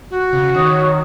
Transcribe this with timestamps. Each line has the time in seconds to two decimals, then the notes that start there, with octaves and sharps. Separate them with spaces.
0.10 F#4
0.33 C#3
0.55 D#3 C#5 C#6 D#6